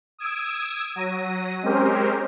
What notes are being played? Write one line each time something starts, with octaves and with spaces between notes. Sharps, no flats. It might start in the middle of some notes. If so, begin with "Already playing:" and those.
D#6 E6 G#6 D7
F#3 A#6 D#7
G#3 C4 C#4 G4 A#4 C5